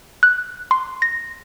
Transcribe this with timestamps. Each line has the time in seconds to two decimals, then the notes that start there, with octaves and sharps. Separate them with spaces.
0.23 F#6
0.71 C6
1.02 A#6